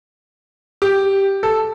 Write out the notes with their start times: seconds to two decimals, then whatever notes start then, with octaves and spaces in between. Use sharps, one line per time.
0.82 G4
1.43 A4